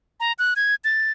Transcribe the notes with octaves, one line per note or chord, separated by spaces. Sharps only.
A#5
F#6
G#6
A6